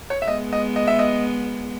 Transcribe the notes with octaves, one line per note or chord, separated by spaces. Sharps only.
C#5
E5
G#3 B3 D#5
D#5
D#5
E5
D#5